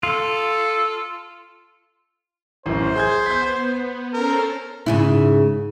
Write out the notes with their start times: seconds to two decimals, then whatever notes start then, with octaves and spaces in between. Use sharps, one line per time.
0.03 F4 A4
2.66 A1 F#2 C5
2.96 G#4 G6 G#6
3.26 B3 G6 B6
4.13 C#4 A4 A#4 C5
4.86 G#2 C#3 E4